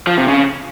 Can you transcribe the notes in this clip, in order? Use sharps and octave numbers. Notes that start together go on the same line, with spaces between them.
F3
C3
C#3